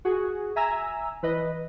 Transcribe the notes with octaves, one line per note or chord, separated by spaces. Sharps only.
F#4 G#4
E5 G#5 A#5 E6
E3 B4 D#5